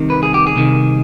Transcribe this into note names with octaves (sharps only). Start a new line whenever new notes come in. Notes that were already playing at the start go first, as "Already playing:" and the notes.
Already playing: C2 C3 D#3
B4
G#4
G4
G#4
C2 C3 D#3